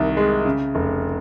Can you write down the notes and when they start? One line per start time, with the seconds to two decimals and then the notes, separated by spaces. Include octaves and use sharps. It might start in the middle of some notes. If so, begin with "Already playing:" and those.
Already playing: C2 D#3
0.17 G#3
0.45 C#3
0.75 F1